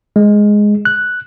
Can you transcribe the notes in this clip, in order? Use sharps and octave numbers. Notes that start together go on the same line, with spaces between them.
G#3
F#6